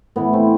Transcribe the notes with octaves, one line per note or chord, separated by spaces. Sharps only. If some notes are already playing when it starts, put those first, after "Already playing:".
A2 E3 B3
A3 C4